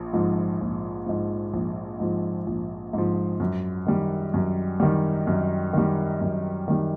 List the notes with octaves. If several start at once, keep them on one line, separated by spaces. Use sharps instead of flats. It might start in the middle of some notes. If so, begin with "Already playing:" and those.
Already playing: A#1
G#2 F3
A#1
G#2 F3
A#1
G#2 F3
A#1
G#2 F3
F#2
D#3 G3
F#2
D#3 G3
F#2
D#3 G3
F#2
D#3 G3